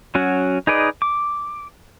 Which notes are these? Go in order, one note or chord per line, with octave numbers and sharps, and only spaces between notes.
F#3 C#4 F#4
D#4 G#4 B4 D5 D#5
D6